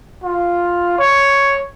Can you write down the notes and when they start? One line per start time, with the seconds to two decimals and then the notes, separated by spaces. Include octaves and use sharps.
0.23 F4
0.98 C#5